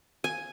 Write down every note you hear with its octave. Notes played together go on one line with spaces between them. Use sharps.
G#5